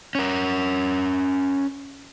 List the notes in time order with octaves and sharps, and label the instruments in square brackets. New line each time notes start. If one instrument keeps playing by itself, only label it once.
[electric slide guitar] C#4 A#4